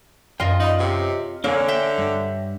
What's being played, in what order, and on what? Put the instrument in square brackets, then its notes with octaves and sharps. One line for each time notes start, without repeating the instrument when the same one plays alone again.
[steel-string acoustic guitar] F#2 [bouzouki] F4 D#5 [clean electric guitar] A#4 G5
[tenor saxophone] D#4 [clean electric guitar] D5 F#5 B5
[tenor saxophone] C3 [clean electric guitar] G#4 C#5
[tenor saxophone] D3 [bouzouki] A#3 [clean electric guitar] D4 G#4 G#5 [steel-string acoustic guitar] C#5
[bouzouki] E5 G5
[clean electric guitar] G2